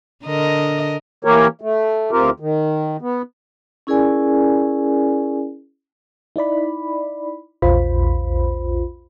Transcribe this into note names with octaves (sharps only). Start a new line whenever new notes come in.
D3 A#4 D#5
E3 A#3 G4 A#4 C#5
A3
D2 C4 F4 G4 A#4
D#3
B3
C#4 E4 G#4 A#4 D5 G#5
D#4 E4 D5 B5
A#1 E2 F4 C5 B5